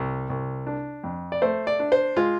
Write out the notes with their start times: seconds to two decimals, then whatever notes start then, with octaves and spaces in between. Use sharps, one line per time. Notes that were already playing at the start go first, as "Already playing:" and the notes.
Already playing: C2
0.30 C2
0.67 D4
1.04 F2
1.32 D5
1.42 A3 C5
1.67 D5
1.80 D4
1.92 C5
2.17 G#3 F4